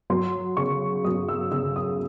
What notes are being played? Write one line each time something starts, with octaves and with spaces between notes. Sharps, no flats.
F#3 C6
C#3 C#6
F#3 D#6
E6
C#3 E6
D#6